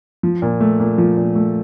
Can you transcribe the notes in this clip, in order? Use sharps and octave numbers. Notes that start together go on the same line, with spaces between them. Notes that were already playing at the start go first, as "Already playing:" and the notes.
F3
A#2
A3
A#2
F3
A#2
A3